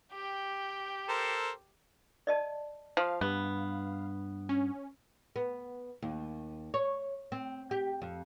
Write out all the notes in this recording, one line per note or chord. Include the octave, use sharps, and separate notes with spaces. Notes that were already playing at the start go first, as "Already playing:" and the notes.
G4 G5
A4 A#4 C5
D5 D#5 A5
F3 F5
G2 B3
C#4
B3
D#2
C#5
C4
G4
F2